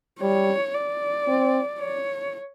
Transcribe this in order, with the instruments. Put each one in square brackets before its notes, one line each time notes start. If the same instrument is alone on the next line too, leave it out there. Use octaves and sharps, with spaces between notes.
[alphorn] G3 [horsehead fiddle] C#5
[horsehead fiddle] D5
[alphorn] C4
[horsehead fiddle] C#5